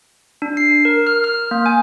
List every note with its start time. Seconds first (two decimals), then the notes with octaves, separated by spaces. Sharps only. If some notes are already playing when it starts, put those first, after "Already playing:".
0.42 D4
0.57 C7
0.85 A#4
1.07 F6
1.24 F6
1.51 A#3
1.66 G#5